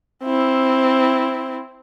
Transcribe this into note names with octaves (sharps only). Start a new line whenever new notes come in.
C4 E4